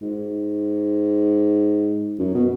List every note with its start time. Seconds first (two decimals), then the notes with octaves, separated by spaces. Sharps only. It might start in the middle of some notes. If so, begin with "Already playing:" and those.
0.02 G#2
2.19 F#2
2.35 B2